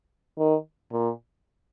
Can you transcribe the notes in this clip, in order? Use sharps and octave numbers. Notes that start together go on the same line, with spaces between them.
D#3
A#2